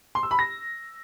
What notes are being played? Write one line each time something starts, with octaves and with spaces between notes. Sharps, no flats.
C6
E6
B5
A#6